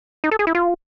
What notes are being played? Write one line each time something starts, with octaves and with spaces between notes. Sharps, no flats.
D#4
A4
G#4
E4
F4